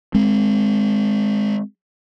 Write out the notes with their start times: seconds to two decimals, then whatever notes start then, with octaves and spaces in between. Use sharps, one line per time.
0.14 G#3 C4